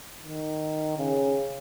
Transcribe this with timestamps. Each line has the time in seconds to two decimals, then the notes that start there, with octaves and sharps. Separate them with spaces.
0.23 D#3
0.98 C#3